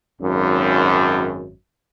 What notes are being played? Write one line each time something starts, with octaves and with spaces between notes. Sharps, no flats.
G#1 F#2